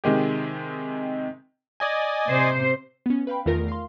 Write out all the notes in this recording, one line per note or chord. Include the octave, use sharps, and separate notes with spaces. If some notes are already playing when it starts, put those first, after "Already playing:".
C3 D#3 G#3 G4
D5 D#5 G#5
C3 C5
B3 C#4
B4 F5 G5 B5
E2 D#3 A3 F4 A#4 A#6
F5 C6